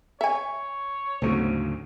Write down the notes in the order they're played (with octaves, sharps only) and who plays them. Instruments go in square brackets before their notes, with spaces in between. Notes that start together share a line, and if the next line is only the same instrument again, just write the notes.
[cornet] C#5 [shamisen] E5 G#5
[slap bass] D2 G#2 C#3 [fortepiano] F#3 A3 C4